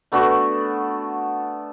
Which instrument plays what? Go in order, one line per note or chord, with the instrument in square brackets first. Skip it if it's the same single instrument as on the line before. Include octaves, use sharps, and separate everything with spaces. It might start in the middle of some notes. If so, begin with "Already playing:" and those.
[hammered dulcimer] A3 B3 D4 F#4